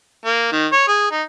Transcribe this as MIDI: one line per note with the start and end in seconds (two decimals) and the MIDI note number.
0.25 0.51 58
0.52 0.67 51
0.72 0.84 73
0.88 1.08 68
1.11 1.22 63